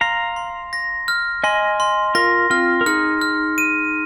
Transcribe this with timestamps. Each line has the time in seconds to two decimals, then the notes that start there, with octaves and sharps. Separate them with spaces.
0.01 F5 A#5 C6
0.36 C6
0.73 A#6
1.08 F6
1.44 D#5 G#5 C6
1.80 C6
2.15 F4 A#4 A#6
2.50 C4 F4 F6
2.81 A#4
2.86 D#4 G#4 F6
3.22 F6
3.58 D#7